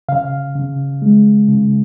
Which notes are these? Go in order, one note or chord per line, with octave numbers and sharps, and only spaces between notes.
C#3 F5
C#3
G#3
C#3